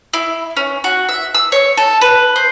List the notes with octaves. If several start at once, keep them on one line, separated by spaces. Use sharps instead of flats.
E4
C#4
F#4
E5
E6
C#5
A4
B4
C5